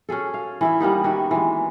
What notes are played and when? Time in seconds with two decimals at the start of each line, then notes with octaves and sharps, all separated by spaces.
0.09 C#4 F#4 G#4 A4
0.34 F5
0.61 E3 E4 E5
0.80 G3 A#3 B3 D#4
1.04 D#3 F#4 E5
1.31 E3 G#3